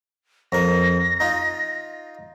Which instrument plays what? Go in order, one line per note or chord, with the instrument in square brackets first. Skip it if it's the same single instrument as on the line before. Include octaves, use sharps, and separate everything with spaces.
[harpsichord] F2 A#4 [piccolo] A#6
[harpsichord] D#4 F4